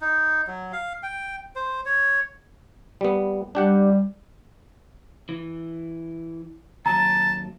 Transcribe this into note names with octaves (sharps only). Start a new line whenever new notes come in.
D#4
F#3
F5
G5
C5
C#5
G3 B3
G3 D4 G4 F#5
E3
D#2 F#3 A5 A#5